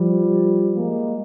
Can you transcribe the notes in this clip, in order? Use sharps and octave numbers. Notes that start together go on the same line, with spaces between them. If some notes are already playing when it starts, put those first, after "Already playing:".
Already playing: F3 G3
G#3 A#3